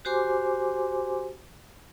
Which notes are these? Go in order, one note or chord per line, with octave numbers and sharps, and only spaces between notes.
F#4 G4 C5 G#5 C6 D6